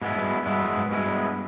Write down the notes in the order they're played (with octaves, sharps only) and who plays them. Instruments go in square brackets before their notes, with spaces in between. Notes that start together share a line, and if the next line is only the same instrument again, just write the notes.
[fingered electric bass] G#2 [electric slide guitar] B2 G#3 B3 E4
[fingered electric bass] G2
[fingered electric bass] G2 [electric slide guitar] B2 G#3 B3 E4
[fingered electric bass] F#2
G#2
[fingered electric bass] G2 [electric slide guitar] B2 G#3 B3 E4